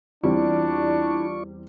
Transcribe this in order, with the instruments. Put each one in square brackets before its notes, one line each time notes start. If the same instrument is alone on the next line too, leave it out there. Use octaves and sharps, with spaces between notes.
[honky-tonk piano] E2 G3 C4 [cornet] D4 [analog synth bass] E4 [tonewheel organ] F4 D5 C#6